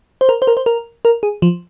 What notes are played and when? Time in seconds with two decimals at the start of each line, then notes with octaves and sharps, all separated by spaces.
0.21 C5
0.29 A#4
0.42 C5
0.47 A#4
0.57 C5
0.66 A#4
1.05 A#4
1.23 G#4
1.42 F3